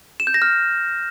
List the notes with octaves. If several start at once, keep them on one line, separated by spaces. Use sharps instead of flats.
E7
G6
A#6
F6